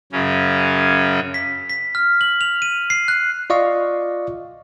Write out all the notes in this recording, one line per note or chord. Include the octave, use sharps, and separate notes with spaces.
F#2 C#3 C#4
B6
B6
F6
F#7
F7
D#7
C7
F#6
F4 D5 D#5 F5 C#6